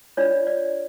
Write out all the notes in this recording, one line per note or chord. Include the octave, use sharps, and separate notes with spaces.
D4 F4 C#5 D5
D5